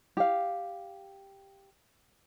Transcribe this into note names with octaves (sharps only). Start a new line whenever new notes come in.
G4 F5